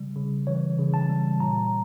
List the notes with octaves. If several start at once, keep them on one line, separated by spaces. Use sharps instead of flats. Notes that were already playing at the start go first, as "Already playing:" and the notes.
Already playing: C#3 G3
C#3
E3 C#5
C#3
A5
G3
A#2 A#5